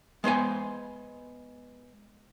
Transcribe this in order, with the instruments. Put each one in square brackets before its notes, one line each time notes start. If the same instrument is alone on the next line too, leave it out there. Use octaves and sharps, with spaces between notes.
[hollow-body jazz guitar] G#3 B3 C5 G#5